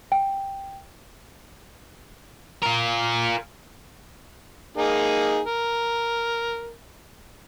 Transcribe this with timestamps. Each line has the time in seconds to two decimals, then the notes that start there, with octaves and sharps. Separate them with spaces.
0.12 G5
2.63 F4 A#4
4.77 A#3 D#4 G#4
5.45 A#4